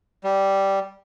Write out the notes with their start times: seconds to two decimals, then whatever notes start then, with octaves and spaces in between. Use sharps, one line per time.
0.24 G3